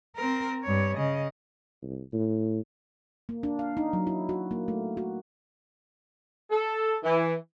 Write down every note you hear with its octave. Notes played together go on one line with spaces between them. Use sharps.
C4 A#4
G2 C#5
C#3 D#5
C2
A2
A#3
D4
F5
D#4
F#3
E4
F#4
A#3
A3
F#4
A4
E3